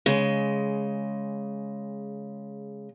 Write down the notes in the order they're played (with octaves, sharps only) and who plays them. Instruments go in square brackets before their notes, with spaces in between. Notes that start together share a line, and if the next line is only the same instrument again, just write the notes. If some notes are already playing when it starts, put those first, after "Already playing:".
[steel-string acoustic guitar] C#3 G#3